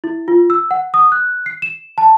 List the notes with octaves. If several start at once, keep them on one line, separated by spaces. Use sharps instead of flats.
E4
F4
E6
F#5
D#6
F#6
C7
E7
A5